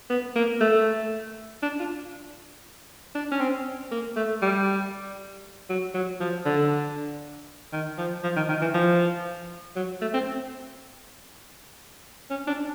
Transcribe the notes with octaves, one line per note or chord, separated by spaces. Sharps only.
B3
A#3
A3
D4
F4
D4
C#4
C4
A#3
A3
G3
F#3
F#3
F3
D3
D#3
F3
F3
D#3
D#3
E3
F3
F#3
A3
C4
C#4
D4